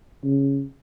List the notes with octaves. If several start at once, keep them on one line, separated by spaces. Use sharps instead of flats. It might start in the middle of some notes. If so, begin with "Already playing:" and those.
C#3